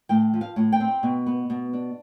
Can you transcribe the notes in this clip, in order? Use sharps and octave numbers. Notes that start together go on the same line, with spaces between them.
A2 G5
F3
F5
A2
G5
C4
B2
B3
B2
D4